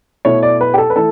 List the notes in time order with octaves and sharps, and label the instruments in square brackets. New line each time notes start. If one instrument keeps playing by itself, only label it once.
[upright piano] B2 A3 E4 C#5
D5
B4
G4
A4
B4
E3 A3 A4